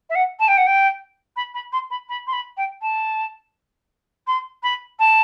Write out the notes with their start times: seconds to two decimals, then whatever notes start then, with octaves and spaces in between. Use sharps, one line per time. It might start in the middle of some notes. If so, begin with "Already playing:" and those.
0.10 E5
0.15 F#5
0.40 A5
0.48 G5
0.58 F#5
0.67 G5
1.36 B5
1.54 B5
1.73 C6
1.91 B5
2.09 B5
2.27 C6
2.33 B5
2.57 G5
2.82 A5
4.27 C6
4.63 B5
4.99 A5